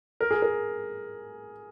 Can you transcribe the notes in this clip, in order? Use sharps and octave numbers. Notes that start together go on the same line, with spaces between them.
A#4
G#4
A#4